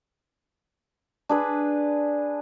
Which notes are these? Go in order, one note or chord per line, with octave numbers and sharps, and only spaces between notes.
D4 G#4 B4